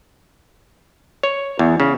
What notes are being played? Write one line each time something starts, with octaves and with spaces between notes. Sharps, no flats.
C#5
E2
C#3